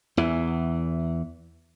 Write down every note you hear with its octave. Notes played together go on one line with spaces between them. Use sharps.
E2 E3